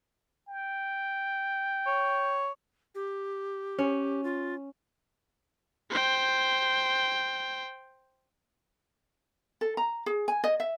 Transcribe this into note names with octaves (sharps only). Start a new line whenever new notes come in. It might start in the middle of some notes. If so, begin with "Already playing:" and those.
G5
C#5
G4
C#4
F4
C5 G5
A4
A#5
G#4
G#5
D#5
E5